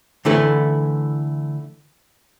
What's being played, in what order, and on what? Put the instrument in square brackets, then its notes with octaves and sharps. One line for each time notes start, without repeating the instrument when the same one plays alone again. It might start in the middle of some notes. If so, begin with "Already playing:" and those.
[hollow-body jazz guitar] D3 E3 A3 E4 A4 B4